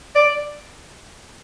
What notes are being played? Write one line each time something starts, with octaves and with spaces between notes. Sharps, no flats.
D5